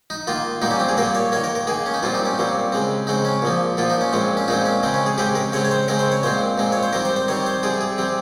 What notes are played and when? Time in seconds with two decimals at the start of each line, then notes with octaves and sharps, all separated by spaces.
0.10 D#4
0.27 D#3 A#3 F4
0.62 A#2 G3 A#3 D#4
0.71 C#4
0.80 C4
0.89 G#4
0.97 A#2 G3 A#3 A#4
1.15 C#5
1.32 D#3 A#3 C#5
1.44 A#4
1.55 A#4
1.67 D#3 A#3 G#4
1.86 C#4
1.94 D#4
2.03 A#2 G3 C4 F4
2.14 D#4
2.26 C#4
2.38 A#2 G3 C4
2.72 C#3 G#3 C4
3.07 C#3 G#3 C4 D#4
3.25 C#4
3.42 A#2 F3 A#3
3.77 A#2 F3 A#3 F4
3.90 D#4
4.01 C#4
4.13 A#2 G#3 C4
4.37 C#4
4.48 A#2 G#3 C4 D#4
4.65 C#4
4.83 C#3 G#3 C4
4.94 C#4
5.06 G#4
5.18 C#3 G#3 C4 G4
5.35 A#4
5.52 C#3 G#3 C4 C#5
5.65 C#5
5.71 C5
5.88 C#3 G#3 C4 A#4
5.99 C5
6.12 C#5
6.23 A#2 G#3 C4 C5
6.58 A#2 G#3 C4
6.72 C#5
6.83 C5
6.93 D#3 G3 C4 A#4
7.05 C5
7.16 C5
7.28 D#3 G3 C4 C#5
7.46 C5
7.63 C3 G3 C4 G#4
7.81 G#4
7.98 C3 G3 C4